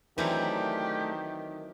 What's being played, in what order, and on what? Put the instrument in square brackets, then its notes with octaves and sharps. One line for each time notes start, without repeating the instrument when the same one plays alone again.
[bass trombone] D#3 [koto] E3 F#3 C4 [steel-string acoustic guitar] A3 D4 A#4 [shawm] G4